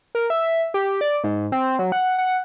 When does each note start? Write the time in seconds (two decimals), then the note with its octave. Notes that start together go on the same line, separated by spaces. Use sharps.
0.15 A#4
0.30 E5
0.74 G4
1.01 D5
1.24 G#2
1.52 C4
1.79 F#3
1.92 F#5
2.18 F#5